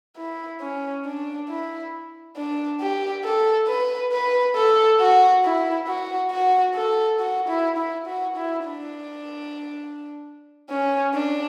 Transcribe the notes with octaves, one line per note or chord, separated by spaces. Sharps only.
E4
C#4
D4
E4
D4
G4
A4
B4
B4
A4
F#4
E4
F#4
F#4
A4
F#4
E4
E4
F#4
E4
D4
C#4
D4